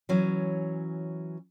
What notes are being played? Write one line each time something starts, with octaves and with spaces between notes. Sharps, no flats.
E3 F#3 C#4